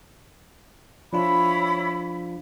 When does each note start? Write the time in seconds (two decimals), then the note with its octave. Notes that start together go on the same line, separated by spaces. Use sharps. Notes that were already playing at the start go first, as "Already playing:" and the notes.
1.13 F3 D4 E4 F4 C#5 B5